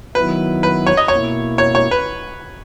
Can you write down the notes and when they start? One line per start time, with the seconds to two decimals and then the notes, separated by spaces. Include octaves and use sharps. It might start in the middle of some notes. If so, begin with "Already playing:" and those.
0.15 D#3 F#3 B3 E4 B4
0.63 B4
0.86 C#5
0.97 D#5
1.08 B2 A#3 E4 C#5
1.58 C#5
1.75 C#5
1.91 B4